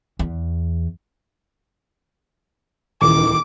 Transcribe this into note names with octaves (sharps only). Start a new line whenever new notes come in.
E2
D#1 C#2 D#3 E3 D6